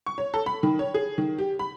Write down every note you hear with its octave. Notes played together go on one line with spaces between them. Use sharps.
C#6
C#5
A4
B5
D#3
C#5
G#4
D#3
G4
B5